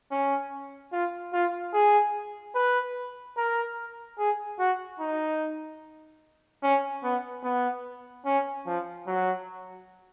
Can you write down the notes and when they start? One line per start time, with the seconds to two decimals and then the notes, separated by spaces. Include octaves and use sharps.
0.11 C#4
0.92 F4
1.33 F4
1.73 G#4
2.55 B4
3.37 A#4
4.18 G#4
4.59 F#4
5.00 D#4
6.63 C#4
7.03 B3
7.43 B3
8.25 C#4
8.66 F3
9.07 F#3